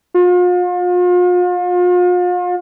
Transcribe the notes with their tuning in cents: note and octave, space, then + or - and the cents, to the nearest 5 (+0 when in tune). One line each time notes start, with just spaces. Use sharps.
F4 +40